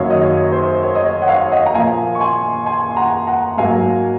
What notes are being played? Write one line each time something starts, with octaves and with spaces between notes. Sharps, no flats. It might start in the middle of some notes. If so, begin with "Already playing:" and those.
Already playing: F#2 D#3 F#3 A#3 C#5 F5
D#5
C#5
C5
C#5
D#5
C#5
F#5
C#5 F5
D#5 F#5
A#5
A#2 F3 A#3 F5 G#5
C#6
G#5 C6
G#5 C6
C6
F#5 A#5
F#5 A#5
G#2 F#3 A#3 F5 G#5